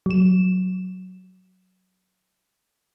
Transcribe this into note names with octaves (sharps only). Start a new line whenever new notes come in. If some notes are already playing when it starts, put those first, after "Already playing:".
F#3 E7